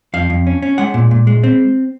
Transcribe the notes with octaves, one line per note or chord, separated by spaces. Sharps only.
F2 F5
F2
C#4
C#4
G#3 F#5
A#2
A#2
G#3
C4